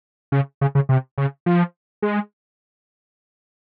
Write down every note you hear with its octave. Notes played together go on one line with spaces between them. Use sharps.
C#3
C#3
C#3
C3
C#3
F3
G#3